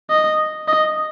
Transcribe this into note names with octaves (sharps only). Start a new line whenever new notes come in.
D#5
D#5